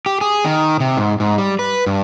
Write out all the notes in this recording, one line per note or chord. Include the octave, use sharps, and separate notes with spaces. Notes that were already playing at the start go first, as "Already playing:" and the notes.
G4
G#4
D#3
C3
G#2
G#2
G3
B4
G2